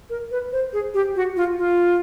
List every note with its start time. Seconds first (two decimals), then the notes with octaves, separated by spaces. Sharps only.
0.10 A#4
0.31 B4
0.52 C5
0.73 G#4
0.94 G4
1.16 F#4
1.36 F4
1.57 F4